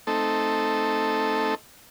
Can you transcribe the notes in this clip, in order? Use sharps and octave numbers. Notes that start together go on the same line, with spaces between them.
A3 C4 D#4 A4